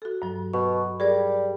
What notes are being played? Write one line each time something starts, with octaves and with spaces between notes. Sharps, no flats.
F#4 A4
G2 F#3
B2 C#6
G3 G#4 A#4 D5